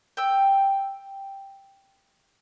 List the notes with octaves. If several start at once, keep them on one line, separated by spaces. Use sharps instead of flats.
G5 E6